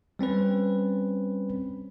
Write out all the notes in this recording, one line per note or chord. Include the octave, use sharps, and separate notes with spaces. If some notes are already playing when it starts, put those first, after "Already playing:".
G3 C4 C#4 B4